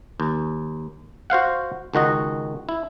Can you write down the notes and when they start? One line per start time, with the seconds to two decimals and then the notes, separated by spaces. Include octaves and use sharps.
0.20 D#2
1.30 F#4 C5 F5 F#5
1.94 C#2 D#3 F#4 D#5
2.69 E4